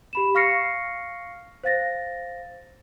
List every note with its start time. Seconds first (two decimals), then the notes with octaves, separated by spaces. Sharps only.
0.13 G4 B5 E7
0.35 F5 C#6 F6 A#6 C7 C#7
1.64 C5 F5 A6 A#6